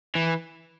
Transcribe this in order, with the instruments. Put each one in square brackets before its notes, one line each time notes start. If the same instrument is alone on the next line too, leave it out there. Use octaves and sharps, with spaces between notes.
[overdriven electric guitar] E3